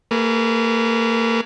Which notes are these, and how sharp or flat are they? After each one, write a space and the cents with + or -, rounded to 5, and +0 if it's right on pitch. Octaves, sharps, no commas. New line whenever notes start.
A#3 -35 G#4 +0 B4 -20